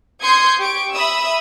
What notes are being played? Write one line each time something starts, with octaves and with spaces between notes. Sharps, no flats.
C6 D#6 G6 G#6 C7 C#7
G4 C#6 D7
E5 B5 D#6 E6